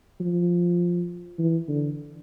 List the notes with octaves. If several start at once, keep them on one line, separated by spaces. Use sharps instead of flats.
F3
E3
D3